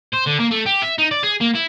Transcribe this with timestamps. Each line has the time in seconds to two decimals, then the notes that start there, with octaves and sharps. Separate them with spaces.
0.13 C5
0.26 D3
0.39 A#3
0.51 A3
0.66 G4
0.82 E5
0.99 D#4
1.11 D5
1.23 G#4
1.41 A#3
1.55 E4